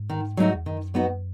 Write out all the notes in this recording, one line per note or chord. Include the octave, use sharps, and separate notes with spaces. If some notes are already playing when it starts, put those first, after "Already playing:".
Already playing: G#2
D#3
F#3 A3 D#4 F#4
E2
F#2 D#3
F#3 B3 D#4 F#4